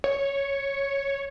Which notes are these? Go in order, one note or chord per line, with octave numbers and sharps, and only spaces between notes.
C#5